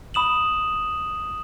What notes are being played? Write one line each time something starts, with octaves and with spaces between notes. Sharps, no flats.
B5 D#6 E7 F#7